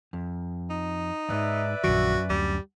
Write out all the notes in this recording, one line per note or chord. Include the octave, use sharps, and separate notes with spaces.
F2
D#4
E2 G#2 B4 D5 E5
A#1 F#2 D#3 F#4
D2 G3